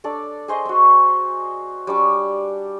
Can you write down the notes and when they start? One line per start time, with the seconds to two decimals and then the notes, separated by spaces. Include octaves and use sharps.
0.04 D4 A4 D5
0.48 G#4 C5 D#5
0.65 C4 F#4
1.87 G3 D4 C#6 D6